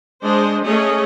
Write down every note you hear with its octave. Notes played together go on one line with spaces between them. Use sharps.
G#3 D4 C5 D#5
A3 C#4 G#4 C#5 D#5